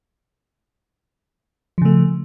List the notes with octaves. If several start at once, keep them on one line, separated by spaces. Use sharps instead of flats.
C#3 F3 A3